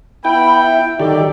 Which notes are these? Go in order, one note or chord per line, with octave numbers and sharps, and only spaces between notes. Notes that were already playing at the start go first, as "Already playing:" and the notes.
B3 E4 G5 B5
E5
D#3 F#3 G3 G4 A4 D5